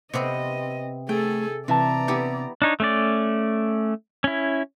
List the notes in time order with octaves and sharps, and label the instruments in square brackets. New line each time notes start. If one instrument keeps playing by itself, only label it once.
[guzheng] C3 B3 C4 [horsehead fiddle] D#5
[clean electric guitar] A3 [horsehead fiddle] G#4 A4 [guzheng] G5
[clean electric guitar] C3 E5 A5 [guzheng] E3 [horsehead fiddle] D5 A#5
[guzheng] B3 E4 G4
[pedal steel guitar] D4 D#4 C#5
A3 C#4 D5
C#4 E4